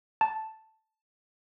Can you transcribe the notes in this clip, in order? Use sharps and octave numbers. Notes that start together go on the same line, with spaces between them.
A5